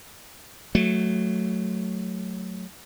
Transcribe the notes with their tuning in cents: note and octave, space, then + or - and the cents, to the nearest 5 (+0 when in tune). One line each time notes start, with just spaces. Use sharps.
F#3 +0 A3 -5